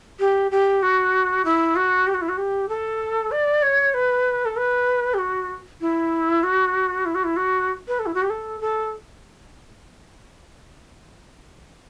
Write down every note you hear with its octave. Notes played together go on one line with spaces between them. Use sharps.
G4
G4
F#4
E4
F#4
G4
F#4
E4
F#4
G4
A4
D5
C#5
B4
A4
B4
G4
F#4
E4
F#4
E4
F#4
E4
F#4
B4
A4
E4
F#4
G4
A4
A4